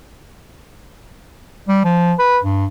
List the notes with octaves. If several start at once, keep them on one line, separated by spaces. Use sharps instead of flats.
G3
F3
B4
G2